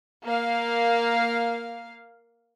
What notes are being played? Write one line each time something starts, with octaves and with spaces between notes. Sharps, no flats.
A#3 F5